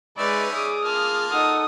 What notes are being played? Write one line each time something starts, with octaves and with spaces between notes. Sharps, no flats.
G#3 C#4 D#4 B4 D5 E5
G#4 D6 D#6
A#3 F4 A5 F6
D#4 A4 F#5 D#6